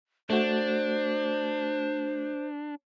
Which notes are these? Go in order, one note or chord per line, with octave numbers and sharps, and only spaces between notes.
A3 D4 F#4 C5